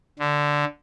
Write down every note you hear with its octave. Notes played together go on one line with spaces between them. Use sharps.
D3